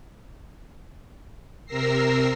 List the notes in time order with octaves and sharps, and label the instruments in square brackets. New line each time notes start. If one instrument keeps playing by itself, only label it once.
[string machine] C3 A#4 E6 A#6 C7